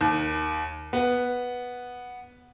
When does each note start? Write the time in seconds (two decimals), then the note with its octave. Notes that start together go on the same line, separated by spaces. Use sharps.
0.01 D#2
0.93 B3